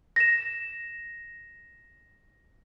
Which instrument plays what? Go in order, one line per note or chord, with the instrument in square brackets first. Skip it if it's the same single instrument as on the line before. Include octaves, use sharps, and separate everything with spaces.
[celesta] A#6 E7